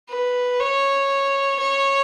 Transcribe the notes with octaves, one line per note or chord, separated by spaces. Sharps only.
B4
C#5
C#5